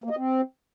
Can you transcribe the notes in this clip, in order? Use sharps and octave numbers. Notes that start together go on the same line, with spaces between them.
A#3
D#5
C4